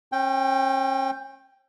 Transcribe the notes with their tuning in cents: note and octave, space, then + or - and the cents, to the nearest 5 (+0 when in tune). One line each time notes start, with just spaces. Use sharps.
C#4 -40 G5 +0